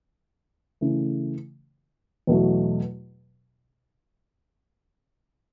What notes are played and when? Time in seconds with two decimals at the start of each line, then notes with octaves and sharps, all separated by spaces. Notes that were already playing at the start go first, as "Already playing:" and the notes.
0.81 C#3 E3 A3
2.27 E2 B2 F#3 A3